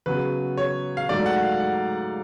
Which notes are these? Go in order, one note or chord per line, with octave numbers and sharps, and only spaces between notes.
C#3 F#3 B3 B4
C#5
F5
G#2 F#3 A3 D5
F#5
F5
F#5